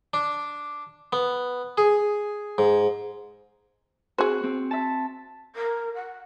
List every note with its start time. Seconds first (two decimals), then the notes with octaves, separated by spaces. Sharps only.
0.14 D4
1.13 B3
1.78 G#4
2.58 G#2
4.18 C4 F#4 G#4 C5
4.43 C4
4.71 E5 A5
5.55 A#4
5.94 F#5